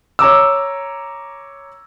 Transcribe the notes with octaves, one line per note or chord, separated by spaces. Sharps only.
C#5 A#5 D6 E6